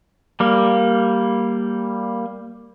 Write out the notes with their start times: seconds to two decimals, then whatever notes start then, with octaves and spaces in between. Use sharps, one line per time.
0.40 G3 A#3